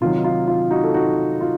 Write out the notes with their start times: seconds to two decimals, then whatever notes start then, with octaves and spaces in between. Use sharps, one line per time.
0.01 C3 D#3 F#3 F4
0.18 D#4
0.24 F4
0.48 F4
0.71 D#4 F#4
0.83 A4
0.94 D#4 F#4
1.41 F4